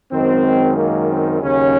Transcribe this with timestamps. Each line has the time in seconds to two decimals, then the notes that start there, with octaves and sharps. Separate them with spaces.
0.12 F#2 D#3 G#3 C4
0.77 A#3
1.10 C4
1.42 D#2 C#3 F#3 C#4